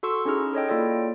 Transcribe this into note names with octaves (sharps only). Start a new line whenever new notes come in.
F#4 A4 C6 C#6 E6
C#4 D#4 E4 G#4 F6
A4 C#5 D#5 G5
A#3 E4 F4 A4 D5 G5